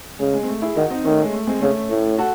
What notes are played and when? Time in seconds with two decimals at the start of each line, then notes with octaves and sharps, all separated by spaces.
0.19 C#3 G#3
0.33 G#3
0.43 C4
0.48 A3
0.62 E4 G#4
0.76 D#3 D#4 F#4
0.90 C4 D#4
1.04 D#3 A3 C#4
1.22 G#3
1.32 A3
1.47 G#3 C4
1.61 C#3 A3 C#4
1.90 A2
2.18 F#4 A4